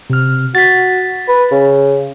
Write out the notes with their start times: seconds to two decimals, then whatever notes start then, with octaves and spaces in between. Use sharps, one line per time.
0.10 C3 F6
0.55 F#4 A6 B6
1.29 B4
1.52 C#3